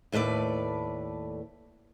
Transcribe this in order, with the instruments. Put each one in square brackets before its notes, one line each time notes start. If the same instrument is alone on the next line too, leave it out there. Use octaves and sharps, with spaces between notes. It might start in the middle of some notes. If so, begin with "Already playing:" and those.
[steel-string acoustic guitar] D#2 A2 A3 B4 D5